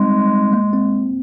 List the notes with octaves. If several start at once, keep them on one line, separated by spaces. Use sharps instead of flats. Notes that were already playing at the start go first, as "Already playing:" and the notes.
Already playing: G3 G#3 C4 D#4
A#3
C4